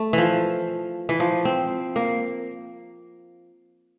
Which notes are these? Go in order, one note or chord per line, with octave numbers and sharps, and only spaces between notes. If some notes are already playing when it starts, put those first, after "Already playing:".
Already playing: A3
E3 F3
E3
F3
C4
A#3